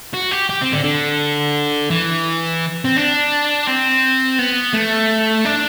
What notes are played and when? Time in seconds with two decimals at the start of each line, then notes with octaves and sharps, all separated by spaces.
0.14 F#4
0.31 G4
0.49 G4
0.61 C4
0.73 D3
0.84 D3
1.91 E3
2.85 C4
2.97 D4
3.67 C4
4.39 B3
4.73 A3
5.45 D4